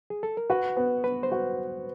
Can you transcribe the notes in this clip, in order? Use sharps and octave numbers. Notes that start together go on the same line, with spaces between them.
G#4
A4
A#4
F#4 B4
B3
B3 B4
C5
F#4